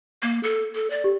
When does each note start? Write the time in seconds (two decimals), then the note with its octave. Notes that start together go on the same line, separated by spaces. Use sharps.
0.23 A#3
0.43 A4
0.75 A4
0.90 D5
1.04 G4